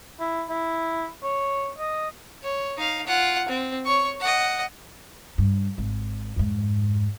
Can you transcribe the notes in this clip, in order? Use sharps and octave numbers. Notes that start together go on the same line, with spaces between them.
E4
E4
C#5
D#5
C#5
D#4 F5
F4 F#5
C4
C#5 C#6
D#5 F#5
G2
G#1
F2 G#2